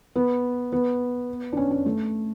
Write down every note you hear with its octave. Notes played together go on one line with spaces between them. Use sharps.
B3
B3
D4
C#4
C#4
A3